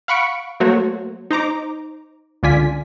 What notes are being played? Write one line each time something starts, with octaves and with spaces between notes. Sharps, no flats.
F5 F#5 B5 C#6 C#7 D7
F#3 A3 A#3 F#4 C5 C#5
D#4 C5 A#5 D6
C#2 D3 F4 D5 G#5 B6